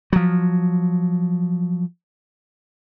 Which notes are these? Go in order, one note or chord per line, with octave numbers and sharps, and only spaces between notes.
F3 F#3